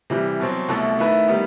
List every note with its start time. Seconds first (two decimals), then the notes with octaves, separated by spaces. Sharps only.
0.10 C3 E3 G3
0.40 B2 F#3 C4
0.68 C2 B2 A3 E4 A4
0.99 D#3 A3 E4 B4
1.28 D#3 G3 B3